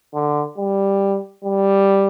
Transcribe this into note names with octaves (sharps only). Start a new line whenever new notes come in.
D3
G3
G3